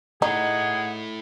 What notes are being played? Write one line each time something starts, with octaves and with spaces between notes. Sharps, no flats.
A3 D#4 E4 G#4 F#5